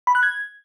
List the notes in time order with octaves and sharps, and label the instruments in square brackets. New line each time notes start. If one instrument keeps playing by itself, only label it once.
[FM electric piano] B5
F#6
G#6